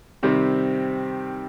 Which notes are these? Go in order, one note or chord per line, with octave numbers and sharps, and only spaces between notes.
C3 D#3 G3 C4